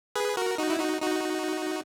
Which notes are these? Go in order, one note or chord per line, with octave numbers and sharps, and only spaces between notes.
G#4 B4
F#4 A#4
D#4 F#4
E4
D#4 F#4
D#4 F#4